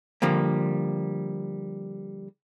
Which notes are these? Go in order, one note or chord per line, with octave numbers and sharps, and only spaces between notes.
D3 F3 G3 A#3